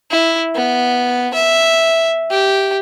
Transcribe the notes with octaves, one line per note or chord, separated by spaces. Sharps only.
E4
B3
E5
G4